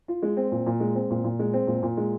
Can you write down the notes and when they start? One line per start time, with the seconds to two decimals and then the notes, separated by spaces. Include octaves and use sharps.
0.08 F4
0.22 G#3
0.37 C4
0.52 A#2
0.66 A#2
0.80 G#3
0.95 C4
1.10 A#2
1.24 A#2
1.39 G#3
1.53 C4
1.67 A#2
1.82 A#2
1.97 G#3